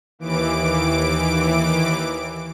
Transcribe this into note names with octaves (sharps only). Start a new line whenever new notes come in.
D#2 E3 D6 D7